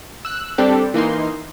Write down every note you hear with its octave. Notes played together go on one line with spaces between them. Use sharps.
E6 F#6
G3 C4 D4 G4 A4
E3 A#3 D#4 C6